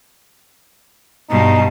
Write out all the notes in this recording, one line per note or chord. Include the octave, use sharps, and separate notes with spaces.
G2 B2 D#4